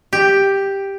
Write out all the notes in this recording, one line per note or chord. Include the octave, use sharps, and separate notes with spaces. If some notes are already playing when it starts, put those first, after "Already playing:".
G4